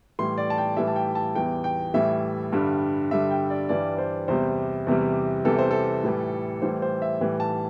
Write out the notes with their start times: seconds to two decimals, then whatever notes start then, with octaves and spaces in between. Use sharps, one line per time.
0.19 A2 E3 G3 C6
0.38 D5
0.50 A5
0.58 G5
0.77 A2 E3 G3 E5
0.87 A5
0.96 G5
1.15 A5
1.35 E2 E3 G3 G5
1.64 G5
1.94 A2 E3 G3 E5
2.52 G2 D3 G3
3.11 G2 D3 G3 E5
3.31 G5
3.50 D5
3.69 G2 E3 G3 D5
3.98 C5
4.28 E2 C3 G3 C5
4.87 E2 C3 E3 G3
5.45 E2 C3 E3 G3 A4
5.59 C5
5.71 A4
6.04 A2 E3 G3
6.62 A2 E3 G3 C5
6.82 C5
7.02 E5
7.21 A2 E3 G3
7.40 A5